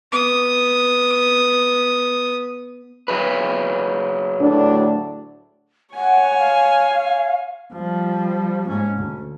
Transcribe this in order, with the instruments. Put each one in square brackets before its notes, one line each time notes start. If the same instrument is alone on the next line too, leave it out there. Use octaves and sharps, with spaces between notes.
[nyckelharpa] B3 D#6
[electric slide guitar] F#3 G#4 B4
[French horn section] D2 A2 D4
[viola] C#5 G#5 [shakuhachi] F#5
[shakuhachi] F5
[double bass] F3 G3
G#2 C#4
D2